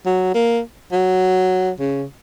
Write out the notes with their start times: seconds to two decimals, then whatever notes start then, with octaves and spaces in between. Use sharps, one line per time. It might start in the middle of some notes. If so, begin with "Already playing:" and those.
0.06 F#3
0.34 A#3
0.92 F#3
1.80 C#3